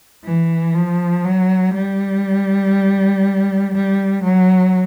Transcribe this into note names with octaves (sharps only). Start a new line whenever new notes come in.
E3
F3
F#3
G3
G3
F#3